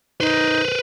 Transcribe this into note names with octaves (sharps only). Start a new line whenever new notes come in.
D#4 B4 C5